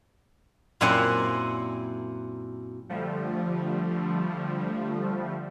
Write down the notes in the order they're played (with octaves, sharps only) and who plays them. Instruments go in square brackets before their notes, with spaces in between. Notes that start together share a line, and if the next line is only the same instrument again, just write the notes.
[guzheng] F#2 A#2 C4 E4 F#5 G#5
[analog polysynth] D3 F3 G3 A3